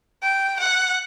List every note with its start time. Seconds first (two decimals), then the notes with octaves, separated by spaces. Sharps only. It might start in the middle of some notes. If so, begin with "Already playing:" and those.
0.22 G5
0.59 F#5